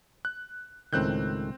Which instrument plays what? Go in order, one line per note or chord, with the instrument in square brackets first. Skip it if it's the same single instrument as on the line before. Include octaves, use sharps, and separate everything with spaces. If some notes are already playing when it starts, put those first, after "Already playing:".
[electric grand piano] F#6
[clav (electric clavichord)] C#2 A2 D#3 [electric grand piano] C4 F#6 G6